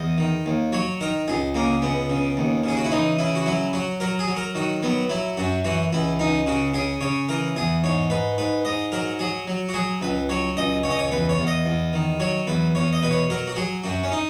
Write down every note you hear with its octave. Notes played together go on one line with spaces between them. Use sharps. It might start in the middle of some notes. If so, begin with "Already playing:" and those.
Already playing: E2 D#5
D#3
D#2
F#3 C#5
D#3 A#4
C#2 G#4
C#3 A#3
C#2 B3
C#3
D#2
C#3 G#4
F#4
E4
E3 D#4
C#3 E4
F#4
F#3 E4
F#3 F#4
F#3 A#4
G#4
F#3
A#4
D#3 F#4
F#3 B3
F#3 E4
F#2 F#4
E3 F#4
C#2 E4
C#2 D#4
C#3 F#4
C#3 G#4
C#3 C#5
E3 A#4
E2 G#4
G#2 C#5
G#2 B4
G#2 B4
G#2 D#5
F#3 A#4
F#3 G#4
F#3
F#4
F#3 G#4
C#2 B4
F#3 C#5
C#2 D#5
C#2 C#5
D#5
C#5
E2 B4
C#5
E2
D#5
E2
D#3
F#3 C#5
E2 B4
E2 C#5
D#5
B2 B4
C#5
F#3 A#4
F#4
F#3 G#4
F#2 F#4
C#4
D#4